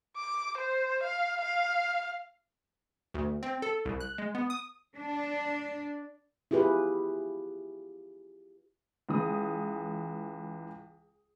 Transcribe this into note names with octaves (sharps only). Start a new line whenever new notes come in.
D6
C5
F5
F5
D2
C4
A4
C2
F#6
G#3
B3
D#6
D4
E4 F4 G4 G#4 B4
C#2 E3 D#6